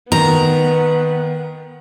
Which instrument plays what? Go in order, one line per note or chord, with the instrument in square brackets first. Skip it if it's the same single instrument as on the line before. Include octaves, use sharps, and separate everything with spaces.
[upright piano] D#3 [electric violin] B3 [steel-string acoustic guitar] A#5